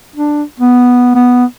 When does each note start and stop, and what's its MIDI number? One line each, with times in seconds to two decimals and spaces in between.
0.16 0.43 62
0.60 1.13 59
1.15 1.45 59